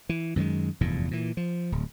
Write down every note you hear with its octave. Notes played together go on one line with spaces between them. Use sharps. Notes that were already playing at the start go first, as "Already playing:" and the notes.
E3
F#2 D#3 F#3 G#3
F1 E2 G2 A#2
A#2 E3
F3
D1